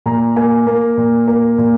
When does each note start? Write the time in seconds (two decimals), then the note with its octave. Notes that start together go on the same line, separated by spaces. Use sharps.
0.06 A#2 A#5
0.36 A#3 G#5
0.67 A#3
0.97 A#2
1.28 A#3
1.58 A#2